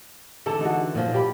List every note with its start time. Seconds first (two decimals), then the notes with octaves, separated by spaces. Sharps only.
0.46 D3 E3 A4 A5
0.61 D#4 F#4
0.95 A#2 F3
1.14 G4 B5